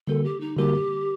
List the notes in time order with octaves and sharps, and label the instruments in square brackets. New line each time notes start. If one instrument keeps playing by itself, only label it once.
[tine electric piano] D3 G3 A#3 F#4 A#4 [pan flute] A4
[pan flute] G4
D#4
[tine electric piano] D3 G3 A#3 F#4 A#4 [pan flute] G4